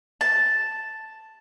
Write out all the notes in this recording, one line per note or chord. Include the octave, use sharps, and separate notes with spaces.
A5